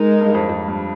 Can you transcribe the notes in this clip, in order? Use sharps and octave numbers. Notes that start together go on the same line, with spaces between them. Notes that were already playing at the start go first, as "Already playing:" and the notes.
Already playing: G#3 D#4 A#4
G2
F2
F2
G2